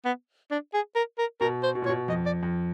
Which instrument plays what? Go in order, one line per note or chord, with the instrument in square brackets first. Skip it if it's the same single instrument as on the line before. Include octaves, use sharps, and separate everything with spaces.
[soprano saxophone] B3
D4
G#4
A#4
A#4
[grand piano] B2 [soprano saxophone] A#4
[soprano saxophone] C5
[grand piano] B2
A#2
[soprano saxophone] C#5
[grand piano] B2
[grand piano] F2 [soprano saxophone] D#5
[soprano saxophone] D5
[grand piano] F2